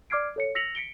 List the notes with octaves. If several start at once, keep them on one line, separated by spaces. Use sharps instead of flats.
D5 D6 F6 G#6 C7 D7
A4 C#5 C#7
E6 A#6 B6 C#7 F7 F#7
B6 C#7 D7 G7